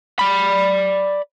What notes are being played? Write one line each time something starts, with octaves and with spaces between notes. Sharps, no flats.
D5 B5